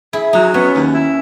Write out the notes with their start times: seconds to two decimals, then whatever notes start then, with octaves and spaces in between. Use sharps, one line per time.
0.13 E4 G#4
0.33 F#3 D#4
0.54 B3 C#4
0.74 D#2
0.95 E4